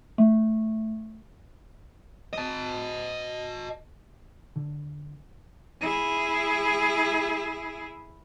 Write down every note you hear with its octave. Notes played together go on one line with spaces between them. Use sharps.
A3
D#5 A5
D3
E4 G#4